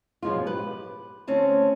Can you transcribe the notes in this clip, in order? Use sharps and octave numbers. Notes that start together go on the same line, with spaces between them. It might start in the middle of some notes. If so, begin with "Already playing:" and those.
F#2 B2 F3 G#3 F4
G4 B4
D2 C4 C#4 A5